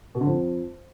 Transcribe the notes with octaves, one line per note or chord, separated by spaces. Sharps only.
B2
D3
F2